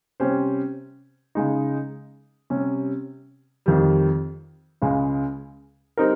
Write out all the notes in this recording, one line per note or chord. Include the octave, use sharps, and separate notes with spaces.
C3 G3 C#4 G4 C5
C#3 G#3 D#4
C3 G3 C#4
F2 D#3 G3
C#2 C#3 G#3
G3 C4 D#4 A#4